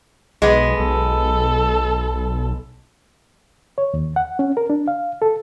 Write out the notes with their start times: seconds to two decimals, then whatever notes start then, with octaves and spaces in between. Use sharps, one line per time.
0.42 B1 G#3 B3
0.79 B1 A4
3.78 C#5
3.94 D#2
4.16 F#5
4.39 C#4
4.57 A#4
4.70 D4
4.88 F5
5.22 A4